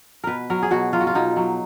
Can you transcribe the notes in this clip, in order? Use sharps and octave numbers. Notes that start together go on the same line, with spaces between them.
B2 A#4 B4
F#3 A#4
G#4
B2 F#4
F#3 F4
F#4
F4
B2 D#4
F#3